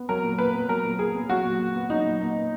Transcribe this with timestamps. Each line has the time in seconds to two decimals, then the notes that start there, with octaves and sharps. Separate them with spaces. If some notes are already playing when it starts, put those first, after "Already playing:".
Already playing: B3
0.09 F#3 A#4
0.24 A#2
0.38 A#2 B4
0.54 B3
0.69 F#3 A#4
0.84 A#2
0.99 A#2 G#4
1.15 B3
1.29 F#3 F#4
1.44 A#2
1.59 A#2
1.74 B3
1.90 F#3 D#4
2.05 A#2
2.20 A#2
2.35 B3